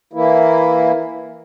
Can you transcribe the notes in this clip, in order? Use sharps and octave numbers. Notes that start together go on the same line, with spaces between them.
E3 A#3 E4